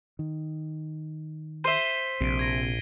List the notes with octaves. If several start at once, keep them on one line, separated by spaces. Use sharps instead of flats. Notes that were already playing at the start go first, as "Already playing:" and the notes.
D#3
C5 E5 C7 D#7 G7
A#1 C3 B6 D7
G#6 A#6 D7